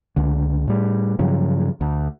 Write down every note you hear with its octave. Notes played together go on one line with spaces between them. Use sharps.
C#2 D3
A2 G3
G2 C#3 F3 F#3
D2